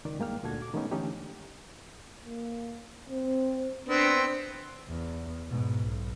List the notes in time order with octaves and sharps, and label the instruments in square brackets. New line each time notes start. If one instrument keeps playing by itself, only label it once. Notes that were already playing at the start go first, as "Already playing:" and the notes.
[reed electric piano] C#2 D#3 D5
G2 G#3 A#3 D#4 G5 F6
D2 A#2 D4 F#4 A4 G#6
D6
D#3 G#3 A3 B3 C#4 D#4
D3 E3 A3 C#4 D#4 G4
[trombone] A#3
C4
[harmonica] B3 C4 [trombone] D4
[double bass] E2
G#2 B2
B1